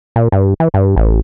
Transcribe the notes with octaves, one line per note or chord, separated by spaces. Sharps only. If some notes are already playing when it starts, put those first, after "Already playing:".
A#2
G2
E3
G2
A1